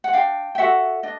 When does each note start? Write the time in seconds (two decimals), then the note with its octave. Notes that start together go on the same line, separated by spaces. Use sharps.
0.04 F#5
0.13 D4 F5 G5
0.55 G5
0.58 F#4 A4 E5 F#5
1.03 D4 D#5